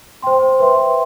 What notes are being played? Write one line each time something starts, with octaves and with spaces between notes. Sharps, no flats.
C5 G5 C6
B4 E5 G5 C6